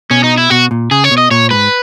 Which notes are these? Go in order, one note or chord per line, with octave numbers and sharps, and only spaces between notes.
B2 C#4
D#4
E4
B2 F#4
A#2
C#3 G#4
C#5
B2
D#5
A#2 C#5
G#2 B4